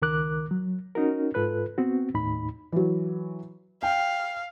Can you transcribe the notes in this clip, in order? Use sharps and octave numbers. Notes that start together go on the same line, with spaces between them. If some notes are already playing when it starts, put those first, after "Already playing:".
C#2 D#3 A#4 D6 F#6
F#3
C#4 D#4 F#4 A#4
G#2 F4 A4 B4 F#6
B3 C4 F#4
D#2 A2 D#4 B5
E3 F#3
F5 G5